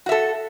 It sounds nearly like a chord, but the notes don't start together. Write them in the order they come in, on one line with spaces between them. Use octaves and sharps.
F#4 E5 A4